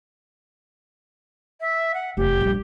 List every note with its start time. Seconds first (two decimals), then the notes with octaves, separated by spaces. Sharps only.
1.61 E5
1.94 F#5
2.17 F1 E2 G4
2.41 A#1 G3